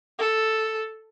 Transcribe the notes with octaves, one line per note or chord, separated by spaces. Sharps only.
A4